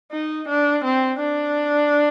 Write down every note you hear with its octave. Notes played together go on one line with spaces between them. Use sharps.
D#4
D4
C4
D4